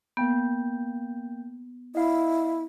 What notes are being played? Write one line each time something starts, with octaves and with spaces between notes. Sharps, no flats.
A#3 B3 G5 G6
E4 D#5 F5